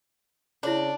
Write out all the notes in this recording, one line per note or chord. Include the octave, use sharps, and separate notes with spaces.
C#3 D4 E4 C#5